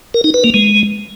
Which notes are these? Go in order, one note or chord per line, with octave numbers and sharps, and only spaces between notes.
A#4
D#4
B4
A#3
G#3